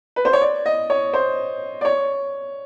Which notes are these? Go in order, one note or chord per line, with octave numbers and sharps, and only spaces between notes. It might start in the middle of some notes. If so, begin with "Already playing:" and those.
B4
C5
C#5
D5
D#5
C#5
C5
D5
C#5